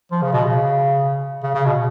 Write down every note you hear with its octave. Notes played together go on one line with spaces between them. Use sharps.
F3
C#3
B2
C#3
C#3
C#3
B2